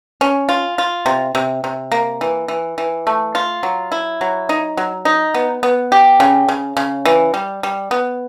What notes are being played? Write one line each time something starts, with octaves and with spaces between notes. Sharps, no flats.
C#4
F4
F4
C3
C3
C3
A#3
E3
E3
E3
A3
F4
F#3
E4
F#3
D#4
F#3
D#4
B3
B3
G4
C#3
C#3
C#3
E3
G3
G3
B3